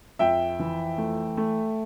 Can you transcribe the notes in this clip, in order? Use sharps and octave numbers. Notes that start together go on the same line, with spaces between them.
F2 E5 G5
E3
A3
A3